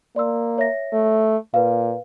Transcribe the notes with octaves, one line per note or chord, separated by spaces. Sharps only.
A#3 D5 C6 E6
C#5 E5 A#6
A3
A#2 B4 F5